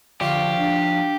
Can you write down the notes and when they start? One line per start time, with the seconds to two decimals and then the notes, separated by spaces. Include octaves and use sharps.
0.21 D3 F3 F4 G4 D5 F5
0.58 D4